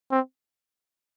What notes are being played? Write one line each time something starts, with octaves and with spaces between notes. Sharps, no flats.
C4